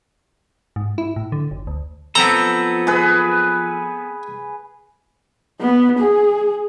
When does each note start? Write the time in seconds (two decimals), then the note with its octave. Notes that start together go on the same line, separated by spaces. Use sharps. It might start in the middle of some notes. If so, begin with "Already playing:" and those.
0.76 G#2
0.98 E4
1.16 A2
1.32 D3
1.51 F#1
1.67 D2
2.15 F3 B3 C4 A4 A#5
2.87 G#4 B4
5.60 B3
5.99 G#4